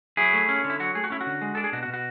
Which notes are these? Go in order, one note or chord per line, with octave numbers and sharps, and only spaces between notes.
F#3 E4 G#4
A3
C#4
D3
E4
F#3 F#4
A3 G#4
F#4
C#4 E4
F#4
D3
G#3
D4 A4
G#4
B2 F#4
F#4
B2
F#4